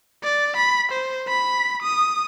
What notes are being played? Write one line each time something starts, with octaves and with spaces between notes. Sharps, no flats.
D5
B5
C5
B5
D#6